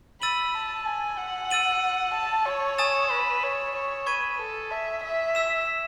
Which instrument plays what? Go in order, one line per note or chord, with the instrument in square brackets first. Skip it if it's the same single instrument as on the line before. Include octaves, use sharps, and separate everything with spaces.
[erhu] B5 [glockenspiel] E6 A6 D#7 F#7
[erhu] A5
G#5
F#5
[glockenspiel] E6 A6 D#7 F#7
[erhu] A5
C#5
[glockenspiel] G#5 D#6 A6 E7
[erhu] B4
C#5
C#5
[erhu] B4 [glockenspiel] C#6 G#6 D#7
[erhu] A4
E5
E5
[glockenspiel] E6 B6 E7